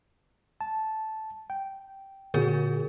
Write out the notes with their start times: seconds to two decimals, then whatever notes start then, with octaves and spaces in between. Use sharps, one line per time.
0.61 A5
1.50 G5
2.34 A#2 D3 F#4 G#4 A#4